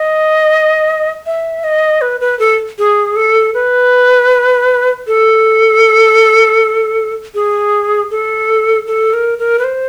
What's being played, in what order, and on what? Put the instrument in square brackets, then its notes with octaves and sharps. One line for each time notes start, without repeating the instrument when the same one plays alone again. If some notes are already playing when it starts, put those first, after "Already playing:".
Already playing: [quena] D#5
E5
D#5
B4
B4
A4
G#4
A4
B4
A4
G#4
A4
A4
A#4
A#4
B4
C5